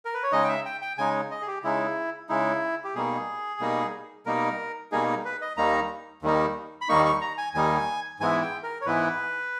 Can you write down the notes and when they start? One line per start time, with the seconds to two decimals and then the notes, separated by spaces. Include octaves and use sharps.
0.05 A#4
0.14 B4
0.23 C#5
0.32 C#3 G#3 D#4 D#5
0.44 G5
0.49 E5
0.65 G5
0.81 G5
0.98 C#3 G#3 D#4 G#5
1.31 D#5
1.41 G#4
1.47 G4
1.63 C#3 G#3 D#4 E4
2.29 C#3 G#3 D#4 E4
2.84 G4
2.95 B2 G3 A#3 D#4 G#4
3.60 B2 G3 A#3 D#4
4.26 B2 G3 A#3 D#4 A#4
4.92 B2 G3 A#3 D#4 G#4
5.25 B4
5.41 D#5
5.57 D#2 D#3 G3 A#3 D#4 A#5
6.23 D#2 D#3 G3 A#3 D#4
6.81 B5
6.89 D#2 D#3 G3 A#3 D#4 C#6
7.05 C#6
7.22 A#5
7.38 G#5
7.54 D#2 D#3 G3 A#3 D#4 G#5
8.20 G#2 E3 G#3 B3 E4 G#5
8.42 G5
8.63 A#4
8.81 C#5
8.85 G#2 E3 G#3 B3 E4 B4